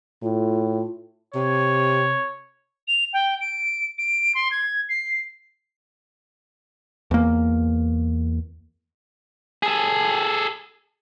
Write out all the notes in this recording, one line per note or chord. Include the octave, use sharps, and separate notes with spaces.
A2 F4
C3 C#5
F7
G5
D7
D7
C6
G#6
C7
E2 A#3
G#4 A4